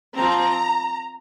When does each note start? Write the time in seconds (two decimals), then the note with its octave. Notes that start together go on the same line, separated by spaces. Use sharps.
0.15 F3 C4 A#5